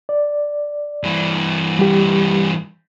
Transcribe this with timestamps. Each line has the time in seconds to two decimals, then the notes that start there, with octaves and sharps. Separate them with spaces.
0.09 D5
1.03 G2 E3
1.79 G3 G4